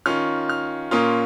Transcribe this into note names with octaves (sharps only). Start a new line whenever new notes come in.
D#3 C#4 F4 F6
F6
A#2 A#3 C#4 F4 D#6